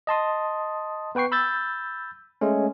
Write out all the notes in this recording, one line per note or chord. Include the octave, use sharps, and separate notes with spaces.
D#5 A5 C6 D#6
B3 B4 G5 C#6 C7
B5 E6 G6 A6
G#3 A3 C#4